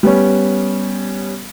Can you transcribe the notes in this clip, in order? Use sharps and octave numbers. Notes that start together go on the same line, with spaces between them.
G3 B3 C#4